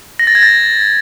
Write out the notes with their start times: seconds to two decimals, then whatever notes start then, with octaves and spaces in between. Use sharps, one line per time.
0.19 A#6
0.27 A6
0.35 G#6
0.43 A6